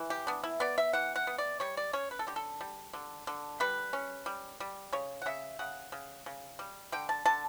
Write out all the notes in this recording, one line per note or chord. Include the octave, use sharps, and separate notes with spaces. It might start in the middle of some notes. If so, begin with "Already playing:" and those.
Already playing: E3
G4
B3 D4
E4
B3 D5
E5
E3 F#5
F#5
B3
D5
G3 C#5
D5
C#4 C#5
B4
A4
D3 G4
A4
G3
D3
D3
G3 B4
C#4
G3
G3
C#3 C#5
F#5
C#3 E5
C#3 F#5
C#3
C#3
G3
D3 G5
A5
D3 A5